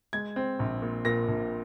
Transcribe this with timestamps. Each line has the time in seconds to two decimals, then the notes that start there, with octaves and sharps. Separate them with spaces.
0.13 G#3 G#6
0.36 C4
0.59 A#1
0.82 A#2
1.05 A#2 A#6
1.28 A#1